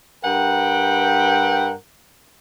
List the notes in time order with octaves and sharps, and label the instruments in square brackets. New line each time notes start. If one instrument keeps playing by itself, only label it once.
[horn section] G2 A#4 B4 F#5 G5